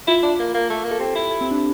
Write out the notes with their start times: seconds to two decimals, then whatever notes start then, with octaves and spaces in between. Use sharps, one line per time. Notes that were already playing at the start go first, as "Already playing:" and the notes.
0.07 E4 F4
0.23 D4
0.39 A#3
0.54 A#3
0.70 A3
0.84 A#3
0.91 A4
1.00 C4 G4
1.15 E4
1.31 A4
1.41 C4
1.51 D4